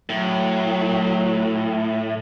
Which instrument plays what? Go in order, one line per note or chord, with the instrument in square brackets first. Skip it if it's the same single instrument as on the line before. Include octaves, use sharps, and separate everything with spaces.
[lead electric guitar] A2 [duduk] F#3